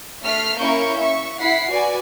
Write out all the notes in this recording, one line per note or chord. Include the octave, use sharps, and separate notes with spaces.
A3 F6 B6 C7
A#3 C#4 E4 A#4 C#6 G6
E5 C#6
E4 F#5 B6 C7
F#4 B4 D5 G#5